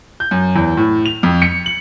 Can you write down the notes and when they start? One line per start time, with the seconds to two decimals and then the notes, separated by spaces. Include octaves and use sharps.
0.20 G6
0.31 F#2
0.56 E2
0.77 A2
1.06 F7
1.23 F2
1.42 C#7
1.66 F#7